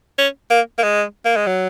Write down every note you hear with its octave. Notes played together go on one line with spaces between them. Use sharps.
C#4
A#3
A#3
G#3
A#3
G#3
F#3